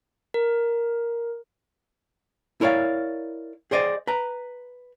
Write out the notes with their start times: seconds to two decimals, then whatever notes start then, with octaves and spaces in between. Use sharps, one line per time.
0.34 A#4
2.61 E4 A#4 C#5 D5 F5
3.71 G#4 C5 D5 D#5
4.07 B4 A#5